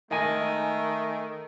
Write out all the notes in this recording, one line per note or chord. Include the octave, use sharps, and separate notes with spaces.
D#3 A3 D#5 G#5